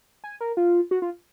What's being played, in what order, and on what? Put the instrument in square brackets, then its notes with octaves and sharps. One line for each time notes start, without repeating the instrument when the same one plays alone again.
[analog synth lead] G#5
A#4
F4
F#4
F4